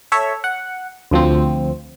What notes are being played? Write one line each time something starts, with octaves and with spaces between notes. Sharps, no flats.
A4 C#5 E5
F#5
D2 F3 C4